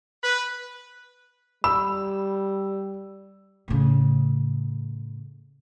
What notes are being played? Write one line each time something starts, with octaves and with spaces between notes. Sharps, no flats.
B4
G3 B5 E6
A2 C#3